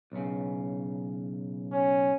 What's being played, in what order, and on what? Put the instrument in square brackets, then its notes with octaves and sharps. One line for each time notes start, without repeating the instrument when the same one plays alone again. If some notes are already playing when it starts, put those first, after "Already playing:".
[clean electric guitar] B1 C#3
[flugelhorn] C#4